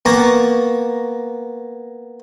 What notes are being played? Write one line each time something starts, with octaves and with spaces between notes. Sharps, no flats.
A#3 B3 A5 A#5 C#6